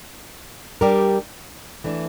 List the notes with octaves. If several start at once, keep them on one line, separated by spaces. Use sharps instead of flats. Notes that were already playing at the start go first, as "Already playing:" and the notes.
G3 D4 G4 A#4
E3 A3 D4